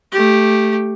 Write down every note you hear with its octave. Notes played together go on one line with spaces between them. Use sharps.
A3 G4